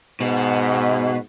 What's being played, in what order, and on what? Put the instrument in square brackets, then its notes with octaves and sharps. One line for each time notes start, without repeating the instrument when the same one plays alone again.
[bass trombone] G#2 [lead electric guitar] B2